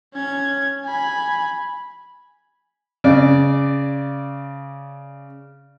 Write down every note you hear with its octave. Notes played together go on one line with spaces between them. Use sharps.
C#4 G#6
G#5 B5
C#3 D5